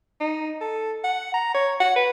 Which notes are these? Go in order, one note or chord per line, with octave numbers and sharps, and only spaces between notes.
D#4
A4
F#5
A#5
C#5
F#5
B4